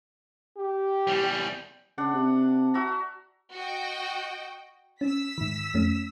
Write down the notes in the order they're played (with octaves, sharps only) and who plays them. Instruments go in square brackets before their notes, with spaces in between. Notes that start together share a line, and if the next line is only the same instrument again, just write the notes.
[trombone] G4
[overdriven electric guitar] E2 G3
[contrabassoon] C#3 [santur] D4 F#5
[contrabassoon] C3
[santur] F#4 E5 A#5
[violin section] F#4 D#5 G5
[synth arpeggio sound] C#4 [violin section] E6 B6
[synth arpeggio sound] G#2 D#3
F2 A3 C#4